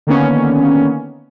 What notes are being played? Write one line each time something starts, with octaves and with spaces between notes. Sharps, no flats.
D3 D#3 A#3 B3 C#4